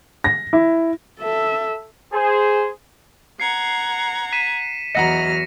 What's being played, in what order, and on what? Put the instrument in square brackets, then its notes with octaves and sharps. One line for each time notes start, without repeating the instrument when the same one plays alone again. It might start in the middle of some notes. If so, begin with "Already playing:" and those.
[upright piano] A#6
E4
[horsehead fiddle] A4 E5
[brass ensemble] G#4 C5
[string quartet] F#5 A#5 G#6 [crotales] C7 C#7
[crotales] B6 D#7 E7
[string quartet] E2 F#3 F6 [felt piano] D#5 F#5 A#5 [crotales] A#6 C#7